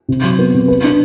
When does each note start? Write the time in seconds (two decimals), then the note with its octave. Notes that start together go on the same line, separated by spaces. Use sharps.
0.09 C3
0.23 F#3
0.39 B3
0.54 C3
0.68 B4
0.84 D4